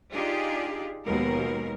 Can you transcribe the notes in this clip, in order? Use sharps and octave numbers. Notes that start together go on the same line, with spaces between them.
D4 D#4 F4 G4 G#4
D#2 G#2 B2 F3 G#3 A#4